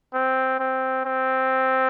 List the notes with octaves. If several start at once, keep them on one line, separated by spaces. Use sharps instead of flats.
C4
C4
C4